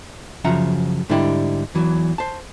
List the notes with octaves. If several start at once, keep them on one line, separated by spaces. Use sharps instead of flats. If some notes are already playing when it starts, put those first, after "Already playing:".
F#2 C#3 F3 E5 F#5 A#5
G#2 D3 G3 D4 E4 G4
E2 E3 F#3
C5 A5